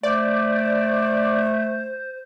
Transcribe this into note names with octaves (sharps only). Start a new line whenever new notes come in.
A3 C5 D5